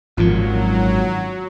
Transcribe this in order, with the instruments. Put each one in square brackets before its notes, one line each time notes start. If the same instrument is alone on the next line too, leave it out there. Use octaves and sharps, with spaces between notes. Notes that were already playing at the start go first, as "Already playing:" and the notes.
[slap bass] G#1 F#2 A#2 [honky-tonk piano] F3 [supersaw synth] F#3